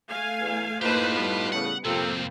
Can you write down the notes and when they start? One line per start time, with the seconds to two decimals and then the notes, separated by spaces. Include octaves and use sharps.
0.10 A3 F5 G#5
0.40 E2
0.82 A2 A#3 D#4 F4 G4 B4 C5 A5
1.14 G3 B3 B4
1.52 A2 C#3 F#5
1.85 C2 F2 C3 F3 A#3 C4 F4 A4